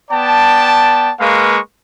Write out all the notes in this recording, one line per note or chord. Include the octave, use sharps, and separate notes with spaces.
B3 D5 G5 A5
G#3 A#3 B4 F5 C#6